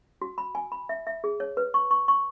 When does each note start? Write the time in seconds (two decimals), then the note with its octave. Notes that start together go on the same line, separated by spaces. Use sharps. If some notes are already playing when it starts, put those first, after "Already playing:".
0.22 F#4
0.38 B5
0.55 G#5
0.72 B5
0.89 E5
1.07 E5
1.24 G#4
1.40 C#5
1.57 B4
1.74 C#6
1.91 C#6
2.08 C#6